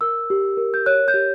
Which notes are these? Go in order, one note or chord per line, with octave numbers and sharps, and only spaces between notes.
A#4 E6
G4
A#4
G6
C#5 F#6
G6
G4